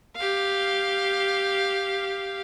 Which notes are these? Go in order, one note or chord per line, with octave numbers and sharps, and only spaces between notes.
G4 F5